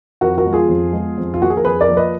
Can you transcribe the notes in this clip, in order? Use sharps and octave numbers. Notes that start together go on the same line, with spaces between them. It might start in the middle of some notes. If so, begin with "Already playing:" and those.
F2 F#4 A#4
F#4 A#4
F3 G#3 B3
F4 G#4
F2
F3 G#3 B3
F2
F4
F3 A#3 F#4
G#4
A#4
F2 G#4 B4
A#4 D5
F3 A#3
B4 D#5